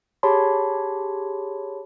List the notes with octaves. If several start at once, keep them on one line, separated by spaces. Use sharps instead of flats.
G4 G#4 C#5 A5 B5 C6